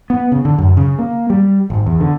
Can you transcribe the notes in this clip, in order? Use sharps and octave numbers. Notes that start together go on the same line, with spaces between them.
B3
C#3
D3
F#2
C#3
A#3
G3
G#1
E2
D3